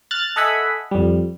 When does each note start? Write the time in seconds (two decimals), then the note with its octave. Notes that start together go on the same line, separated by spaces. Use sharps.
0.11 F6 F#6 A6
0.36 A4 D#5 E5 F#5 G#5 B5
0.91 F2 G3